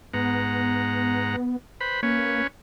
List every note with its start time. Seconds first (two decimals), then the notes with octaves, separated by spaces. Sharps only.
0.14 G#2 B3 F#5 A#5
1.81 B4 C5 B5
2.03 A#3 C#4 B4 C#5